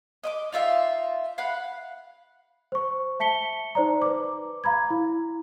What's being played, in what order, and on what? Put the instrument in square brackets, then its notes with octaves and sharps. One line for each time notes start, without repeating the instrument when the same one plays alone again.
[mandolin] D#5 E5 D6
D#4 F4 E5 F5
F5 F#5 B5 F#6
[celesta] C5 C#6
E5 A5 B6 C#7 G7
D#4 C5 D5 A#5
B4 D6
F5 A#5 B5 G#6
E4